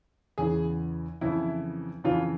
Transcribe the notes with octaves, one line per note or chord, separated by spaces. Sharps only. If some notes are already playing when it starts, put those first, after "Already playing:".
E2 C#3 E3 G#4
F2 C#3 E3 E4
F2 C#3 E3 F4